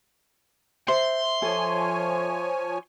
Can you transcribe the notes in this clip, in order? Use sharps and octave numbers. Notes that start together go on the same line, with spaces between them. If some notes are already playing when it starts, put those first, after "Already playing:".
C5 E5 C6 C7
F3 A4 C#5 G#5